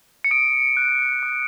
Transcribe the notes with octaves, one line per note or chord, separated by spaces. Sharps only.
C#7
D#6 D7
F#6
D#6